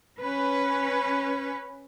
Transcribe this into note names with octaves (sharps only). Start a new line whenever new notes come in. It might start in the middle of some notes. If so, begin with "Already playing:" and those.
C#4 B4